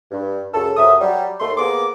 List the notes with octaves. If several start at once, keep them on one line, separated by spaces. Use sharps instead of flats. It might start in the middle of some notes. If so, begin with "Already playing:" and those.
G2
C#2 F#2 A4
F#2 C3 E5 D#6
F#3 G3
D#2 A3 C6
C3 A#3 B3 G#4 D6